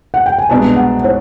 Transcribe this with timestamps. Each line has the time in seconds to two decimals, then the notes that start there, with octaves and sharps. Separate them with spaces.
0.14 F#5
0.26 G5
0.38 G#5
0.49 C2 B2 G#3 B3 D4 A5
0.77 F#5
1.04 C#5